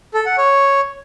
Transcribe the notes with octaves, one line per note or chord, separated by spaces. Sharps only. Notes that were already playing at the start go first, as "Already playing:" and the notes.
A4
F#5
C#5